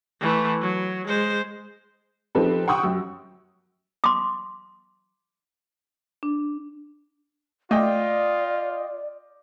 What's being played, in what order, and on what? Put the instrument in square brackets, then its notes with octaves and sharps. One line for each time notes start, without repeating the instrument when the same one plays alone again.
[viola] E3 A3
F#3
G#3 C5
[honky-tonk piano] F3 C4 D#4 G4 A4 B4
F#5 G5 C#6 D#6 E6
F#2
[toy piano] C6 D6
[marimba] D4
[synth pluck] A3 [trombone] F4 [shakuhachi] D5 [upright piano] D#5 G5 D6